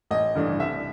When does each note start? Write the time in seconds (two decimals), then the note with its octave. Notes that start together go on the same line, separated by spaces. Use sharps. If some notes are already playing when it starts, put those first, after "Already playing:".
0.11 A1 D#5
0.35 G2 E3 A3 D4
0.59 C2 E5